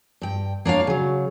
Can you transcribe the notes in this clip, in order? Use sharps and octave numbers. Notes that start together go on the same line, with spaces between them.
G2 G5
A#3 D4 C#5 F5
C#3 F#3